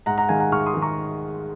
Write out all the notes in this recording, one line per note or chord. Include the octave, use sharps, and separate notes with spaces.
G#2 F#5 A#5
F#5 A#5
D#3 G#3 F5 G#5
F#5 A#5
G#2 C#6 F6
C6 D#6
D#3 G#3
A#5 C#6